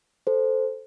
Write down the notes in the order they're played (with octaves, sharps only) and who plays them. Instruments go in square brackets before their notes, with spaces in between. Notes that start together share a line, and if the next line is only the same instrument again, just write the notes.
[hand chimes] A4 C5